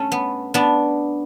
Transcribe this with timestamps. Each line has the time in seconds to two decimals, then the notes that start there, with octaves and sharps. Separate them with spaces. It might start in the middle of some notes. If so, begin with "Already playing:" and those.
Already playing: G2 A3 C#4
0.12 B3
0.54 B3 D4